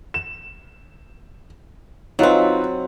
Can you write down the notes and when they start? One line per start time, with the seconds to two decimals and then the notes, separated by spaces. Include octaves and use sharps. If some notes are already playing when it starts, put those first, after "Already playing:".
0.14 E7
2.19 F#3 C4 D#4 F4 B4